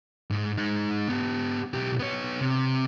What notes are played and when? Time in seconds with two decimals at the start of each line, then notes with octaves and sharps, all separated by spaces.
0.30 G#2
0.58 G#3 D#4
1.09 B3 G4
1.74 B1 G4
1.99 B3 C#5
2.41 C3